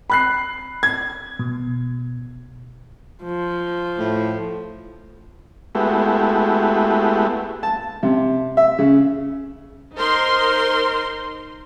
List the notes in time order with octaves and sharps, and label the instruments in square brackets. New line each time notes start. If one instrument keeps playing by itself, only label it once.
[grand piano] B5 F#6 C7
G#6
[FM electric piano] B2
[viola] F3
[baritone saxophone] A2
[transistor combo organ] G#3 A3 B3 E4 F#4 G4
[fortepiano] A5
C3
E5
C#3
[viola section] D#4 A#4 C5 C6